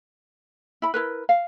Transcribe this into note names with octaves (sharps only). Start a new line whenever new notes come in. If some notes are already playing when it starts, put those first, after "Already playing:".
E4 B5
E4 A#4 B4
F5